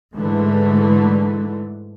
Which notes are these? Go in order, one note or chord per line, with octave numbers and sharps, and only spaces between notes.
G#2 D3 E3 A3